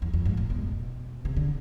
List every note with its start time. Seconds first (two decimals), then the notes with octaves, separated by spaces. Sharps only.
0.02 E2
0.14 F2
0.25 G#2
0.37 A2
0.50 B2
1.25 C3
1.36 D3